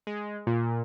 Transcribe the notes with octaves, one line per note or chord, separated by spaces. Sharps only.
G#3
A#2